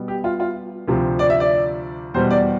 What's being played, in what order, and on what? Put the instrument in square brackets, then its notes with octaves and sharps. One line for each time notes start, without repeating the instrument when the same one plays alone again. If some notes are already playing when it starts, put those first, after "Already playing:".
Already playing: [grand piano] B2 G3 B3
G4
F4
F4
D2 C3 F3
D5
E5
D5
E2 B2 G3 C5
D5